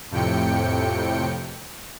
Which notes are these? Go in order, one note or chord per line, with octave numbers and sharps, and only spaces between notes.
F2 A2 C3 G5 C#7